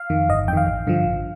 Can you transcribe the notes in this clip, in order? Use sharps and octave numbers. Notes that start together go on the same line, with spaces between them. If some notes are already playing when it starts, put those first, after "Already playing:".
Already playing: F5
F2 D#3
G1 D#5
F2 G5
D#3 F5
A1
G2 D3 F3
A1